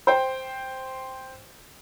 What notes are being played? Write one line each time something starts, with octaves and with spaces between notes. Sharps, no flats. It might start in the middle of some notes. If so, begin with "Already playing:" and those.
C5 G5